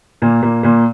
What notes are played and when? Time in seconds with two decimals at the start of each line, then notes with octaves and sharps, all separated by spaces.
0.22 A#2 A#3
0.42 A#2 A#3
0.63 A#2 A#3